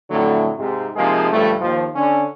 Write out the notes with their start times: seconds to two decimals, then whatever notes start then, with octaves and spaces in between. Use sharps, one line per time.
0.10 F2 A2 D3 F#3 A3
0.59 G#2 C3
0.96 C3 F3 G#3 A#3 D#4 G#4
1.32 C#2 G2 F3 A3
1.61 D#2 F3
1.96 D3 C#4